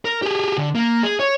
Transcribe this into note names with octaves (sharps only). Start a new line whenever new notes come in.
A#4
G4 G#4
D3
A#3
G#4
C#5